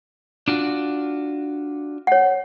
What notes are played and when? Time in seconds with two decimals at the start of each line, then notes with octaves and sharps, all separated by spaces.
0.48 D4 F4 F#4
2.07 C#5 F#5